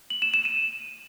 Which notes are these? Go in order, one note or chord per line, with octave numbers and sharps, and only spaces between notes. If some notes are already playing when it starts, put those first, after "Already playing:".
F#7
E7
E7
D#7